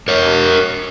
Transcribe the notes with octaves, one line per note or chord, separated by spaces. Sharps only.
A#4 C#5